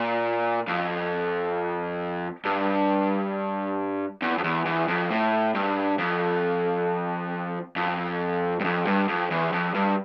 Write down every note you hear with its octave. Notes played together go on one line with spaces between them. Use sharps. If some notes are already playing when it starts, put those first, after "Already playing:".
Already playing: A#2
F2
G2
E2
F2
E2
E2
F2
A2
G2
F2
F2
G2
F2
G2
F2
E2
F2
G2